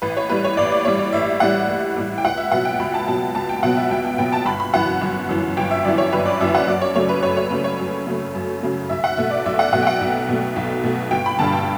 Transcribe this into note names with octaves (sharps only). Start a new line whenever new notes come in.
A1 B4
C#5
A2 G3 B4
C#5
A1 D5
D5
A2 G3 C#5
D5
A1 E5
A2 G3 F#5
A1
A2 G3
G5
C#2 F#5
E5
B2 F#3 B3 F#5
G5
C#2 B5
A5
B2 F#3 B3 A5
C#2 A5
G5
B2 F#3 B3 F#5
E5
C#2 G5
G5
B2 F#3 B3 G5
A5
G1 B5
B5
F#2 E3 F#5
G1
F#2 E3
G1 G5
E5
F#2 E3 D5
C#5
G1 B4
D5
F#2 E3 E5
F#5
F#2 D5
C#5
C#3 F#3 A3 C#5
B4
F#2 C#5
C#5
C#3 F#3 A3 B4
C#5
F#2
C#3 F#3 A3
F#2
C#3 F#3 A3
B1 E5
F#5
B2 A3 E5
D5
B1 E5
F#5
B2 A3 F#5
G5
F#5
B1
B2 A3
B1
B2 A3
G1 G5
B5
G2 D3 A5
G5